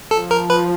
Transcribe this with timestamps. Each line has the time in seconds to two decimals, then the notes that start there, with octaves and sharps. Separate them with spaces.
0.11 F3 A4
0.31 A#4
0.50 B4